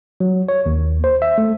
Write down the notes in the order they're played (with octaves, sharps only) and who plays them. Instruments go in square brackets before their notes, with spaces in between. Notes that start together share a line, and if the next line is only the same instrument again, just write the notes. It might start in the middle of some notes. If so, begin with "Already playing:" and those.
[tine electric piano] F#3
C#5
D#2
C5
E5
A3